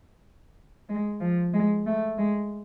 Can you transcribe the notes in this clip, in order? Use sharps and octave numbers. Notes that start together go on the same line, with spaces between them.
G#3
F3
G#3
A3
G#3